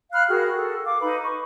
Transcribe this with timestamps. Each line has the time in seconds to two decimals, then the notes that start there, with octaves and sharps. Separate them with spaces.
0.13 F5 B5 F6 F#6
0.28 F#4 G#4 A#4 G5
0.54 A4
0.84 F5 D6
1.01 D#4 B4 B5
1.22 C#6